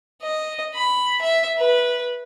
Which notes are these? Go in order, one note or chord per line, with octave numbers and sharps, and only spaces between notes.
D#5
B5
E5
B4